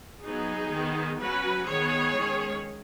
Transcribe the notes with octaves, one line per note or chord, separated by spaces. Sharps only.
F#3 B3 D#4 G#4
D#3 B3
F#3 C#4 F#4 B4
D#3 B3 G#4 C#5
D#3 G#3 C#4